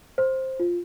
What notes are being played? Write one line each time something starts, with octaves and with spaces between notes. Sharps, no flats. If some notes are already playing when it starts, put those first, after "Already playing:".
C5
F4